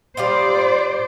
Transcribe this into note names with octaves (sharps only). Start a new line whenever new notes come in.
G3 F4 C5 D5 D#5